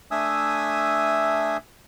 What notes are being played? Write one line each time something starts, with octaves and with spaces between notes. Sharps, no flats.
A3 D4 E5 G#5 D#6 E6